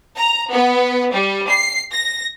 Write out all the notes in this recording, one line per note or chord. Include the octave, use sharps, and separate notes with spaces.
A#5
B3
G3
C7
A#6